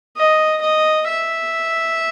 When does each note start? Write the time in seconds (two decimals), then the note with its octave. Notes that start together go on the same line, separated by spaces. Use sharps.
0.17 D#5
0.61 D#5
1.08 E5